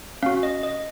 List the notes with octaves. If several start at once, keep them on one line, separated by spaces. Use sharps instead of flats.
C#4 F#4 F5
D#5
D#5